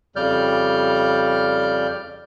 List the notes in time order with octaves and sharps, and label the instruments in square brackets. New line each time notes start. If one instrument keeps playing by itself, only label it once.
[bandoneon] F2 C#3 G3 D5 F6 G6